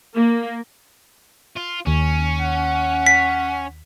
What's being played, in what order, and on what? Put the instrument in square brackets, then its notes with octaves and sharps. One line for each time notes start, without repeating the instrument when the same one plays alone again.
[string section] A#3
[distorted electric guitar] F4
[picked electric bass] D#2 [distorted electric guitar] C#4
[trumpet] F#5
[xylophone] B6